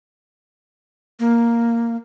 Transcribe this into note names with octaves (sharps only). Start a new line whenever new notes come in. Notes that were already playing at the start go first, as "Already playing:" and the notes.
A#3